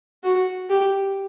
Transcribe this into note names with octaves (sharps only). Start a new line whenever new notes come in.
F#4
G4